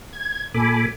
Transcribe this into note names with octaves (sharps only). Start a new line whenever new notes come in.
G#6
A#2 A4 G#5 B5 D6